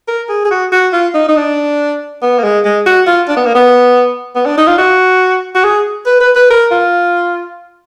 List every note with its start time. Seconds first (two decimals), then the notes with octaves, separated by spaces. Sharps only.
0.08 A#4
0.29 G#4
0.45 G#4
0.51 F#4
0.72 F#4
0.93 F4
1.14 D#4
1.29 D#4
1.36 D4
2.22 B3
2.39 A#3
2.44 G#3
2.65 G#3
2.86 F#4
3.07 F4
3.28 D4
3.37 B3
3.46 A#3
3.55 B3
4.35 B3
4.46 D4
4.58 D#4
4.67 F4
4.78 F#4
5.55 F#4
5.64 G#4
6.06 B4
6.20 B4
6.35 B4
6.50 A#4
6.71 F4